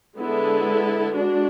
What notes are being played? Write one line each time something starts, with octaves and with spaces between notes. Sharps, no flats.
D3 G#3 B3 E4 A4
G#3 D4 F#4